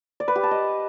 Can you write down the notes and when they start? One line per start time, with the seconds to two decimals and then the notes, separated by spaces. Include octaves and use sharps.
0.20 D5
0.28 B4
0.36 G4
0.43 A5
0.51 D#5